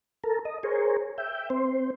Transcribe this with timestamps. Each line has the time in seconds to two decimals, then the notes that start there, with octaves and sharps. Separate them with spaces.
0.24 A4 A#4
0.45 D#5
0.63 G#4 A#4 C5 C#5
1.18 E5 G5
1.50 C4 C5